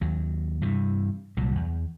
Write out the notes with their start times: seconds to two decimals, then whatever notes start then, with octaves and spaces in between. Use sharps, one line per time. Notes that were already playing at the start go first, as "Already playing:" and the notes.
0.01 D#2 F#3
0.61 G2 C3 E3
1.37 C2 A#2 F#3 G3
1.55 E2